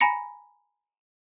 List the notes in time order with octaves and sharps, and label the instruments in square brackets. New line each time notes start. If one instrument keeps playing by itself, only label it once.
[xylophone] G#5 A#5 B5 A#6 C#7